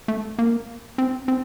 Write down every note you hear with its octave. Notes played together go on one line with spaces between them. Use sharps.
A3
A#3
C4
C4